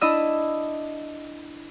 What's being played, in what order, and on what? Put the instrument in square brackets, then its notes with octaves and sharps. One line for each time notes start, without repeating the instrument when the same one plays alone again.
[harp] D4 E4 D#5 D#6 E6